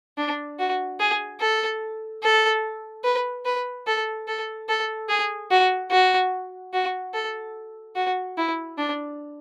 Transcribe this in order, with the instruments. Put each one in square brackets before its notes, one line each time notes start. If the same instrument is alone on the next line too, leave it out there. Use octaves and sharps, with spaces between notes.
[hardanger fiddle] D4
F#4
G#4
A4
A4
B4
B4
A4
A4
A4
G#4
F#4
F#4
F#4
A4
F#4
E4
D4